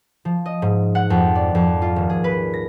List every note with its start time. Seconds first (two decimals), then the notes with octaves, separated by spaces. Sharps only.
0.25 F3
0.46 D#5
0.62 G#2
0.95 F#5
1.10 F2
1.35 D5
1.55 F2
1.82 F4
1.96 D#1
2.10 G#4
2.24 B4
2.53 A#6